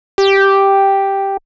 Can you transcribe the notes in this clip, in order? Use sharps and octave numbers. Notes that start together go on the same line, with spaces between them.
G4